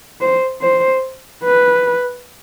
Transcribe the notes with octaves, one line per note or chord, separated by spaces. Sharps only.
C5
C5
B4